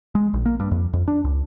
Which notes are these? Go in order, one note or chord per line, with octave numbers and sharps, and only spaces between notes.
G#3
A#1
A#3
G2
F2
F2
D4
C#2